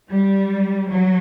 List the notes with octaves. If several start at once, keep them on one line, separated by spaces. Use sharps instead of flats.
G3
F#3